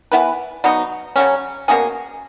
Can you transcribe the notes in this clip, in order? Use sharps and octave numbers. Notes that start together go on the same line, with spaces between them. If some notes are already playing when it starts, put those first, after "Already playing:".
E3 B3 E4 B4
B2 F#3 B3 D#4
C#3 F#3 C#4
B2 A#3 C#4 G#4